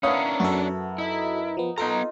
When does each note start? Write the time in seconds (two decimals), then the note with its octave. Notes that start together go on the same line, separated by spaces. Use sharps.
0.03 B3 C#4 D4 E4 A#4 C#5 F5 D#6
0.40 F#2 F#4 A4
0.98 D#4 E4
1.57 F3 B3
1.78 B3 D#4 F4 A4 B4 A#5